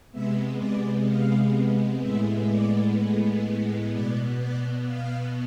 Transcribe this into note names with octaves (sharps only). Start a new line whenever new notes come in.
C3 G#3 B3 E5
D5
F5
A2 G#3 B3 E5
D5
B2 B3 D5
D5
F5